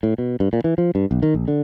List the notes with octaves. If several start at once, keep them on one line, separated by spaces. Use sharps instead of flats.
A2
B2
G2
A#2
E3
F3
G2
B1
D#3
A#1
D3